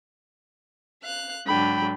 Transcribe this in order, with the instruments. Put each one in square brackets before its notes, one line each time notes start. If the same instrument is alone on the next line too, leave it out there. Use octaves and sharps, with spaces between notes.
[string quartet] F5 F#6
[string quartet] G#2 D3 F#3 [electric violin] G5 B5